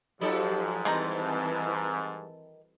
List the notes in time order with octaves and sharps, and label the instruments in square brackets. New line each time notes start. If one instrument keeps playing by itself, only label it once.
[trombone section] G#2 [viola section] F3 G4 [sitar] F#3 D#4 A4
[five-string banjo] D#3 C5 A#5 [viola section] E3 C4 A5 [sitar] G3